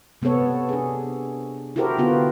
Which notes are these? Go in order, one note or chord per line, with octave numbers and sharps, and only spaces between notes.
C3 B3 C4 A4 C#5
D4 G#4
E4 F#4 G4 A4 A#4 C5
D3 B3 F4 F#4 B4